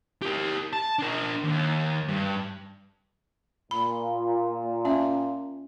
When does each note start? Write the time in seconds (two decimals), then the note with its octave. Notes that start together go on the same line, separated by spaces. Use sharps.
0.22 G4 A#4
0.73 A5
0.99 D4 A#4
1.44 D#2
2.08 G2
3.71 A#2 B5
4.85 C#4 E5